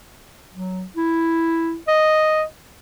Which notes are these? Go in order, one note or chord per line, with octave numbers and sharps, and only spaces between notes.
F#3
E4
D#5